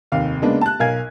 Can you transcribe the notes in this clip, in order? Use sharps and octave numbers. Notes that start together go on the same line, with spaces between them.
F1 D#2 F5
C#3 G#3 A#3 B3 D4
A5 F#6
B1 A#4 F5 G#5 G#6